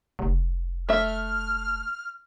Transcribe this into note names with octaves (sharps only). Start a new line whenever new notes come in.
F1
A3 E5 F6